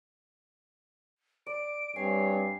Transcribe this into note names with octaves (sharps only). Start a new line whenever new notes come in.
D5 D7
G2 C4 C#5 G#5 C7